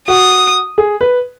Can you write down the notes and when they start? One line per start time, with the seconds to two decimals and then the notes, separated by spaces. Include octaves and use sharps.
0.08 F#4 D#6
0.78 G#4
1.01 B4